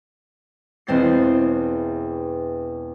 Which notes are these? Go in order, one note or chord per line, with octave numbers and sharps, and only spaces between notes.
E1 E2 C4 A6 C7